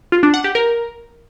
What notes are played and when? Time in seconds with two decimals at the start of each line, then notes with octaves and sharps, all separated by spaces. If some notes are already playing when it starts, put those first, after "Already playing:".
0.12 F4
0.23 D4
0.34 F#5
0.44 G4
0.55 A#4